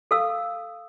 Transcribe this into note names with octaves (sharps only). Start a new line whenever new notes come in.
A4 F5 E6